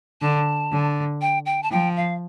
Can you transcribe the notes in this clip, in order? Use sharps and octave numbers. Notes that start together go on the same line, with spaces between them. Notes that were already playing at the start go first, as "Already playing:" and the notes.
D3 A5
D3
G5
G5
A5
F3 G5
F5